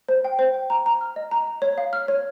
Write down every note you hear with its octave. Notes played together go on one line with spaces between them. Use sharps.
C5
G5
C5
G5
A#5
A#5
F6
D#5
A#5
A#5
C#5
F5
F6
C#5